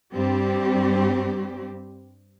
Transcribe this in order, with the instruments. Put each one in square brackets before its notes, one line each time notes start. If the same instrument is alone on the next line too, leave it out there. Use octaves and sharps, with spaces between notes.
[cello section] G2 G3 C4 G4